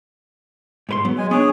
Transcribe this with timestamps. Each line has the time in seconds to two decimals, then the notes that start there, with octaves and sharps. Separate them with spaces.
0.89 G#2 B4 C6
1.05 F#3 B3
1.18 G#3 G#5
1.31 B3 D4 G#4 C#5